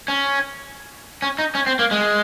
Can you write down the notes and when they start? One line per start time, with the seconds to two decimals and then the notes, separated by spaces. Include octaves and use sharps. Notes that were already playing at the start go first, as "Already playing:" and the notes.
0.08 C#4
1.22 C#4
1.39 D#4
1.55 C#4
1.67 C4
1.79 A#3
1.91 G#3